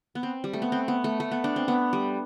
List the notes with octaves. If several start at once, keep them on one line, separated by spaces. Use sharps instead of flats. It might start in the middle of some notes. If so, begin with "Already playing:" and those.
B3
C4
G3
A3
B3
C4
B3
A3
A3
B3
D4
C4
B3
G3